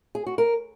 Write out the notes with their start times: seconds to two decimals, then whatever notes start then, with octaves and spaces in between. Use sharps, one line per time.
0.15 G#4
0.26 F#4
0.38 A#4